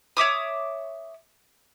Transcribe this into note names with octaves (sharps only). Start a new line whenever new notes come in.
C#5 E5 D6 D#6